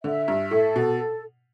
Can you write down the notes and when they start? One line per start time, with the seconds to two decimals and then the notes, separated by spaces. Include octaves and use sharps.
0.04 D3 E5
0.28 G2
0.51 A2 A4
0.76 B2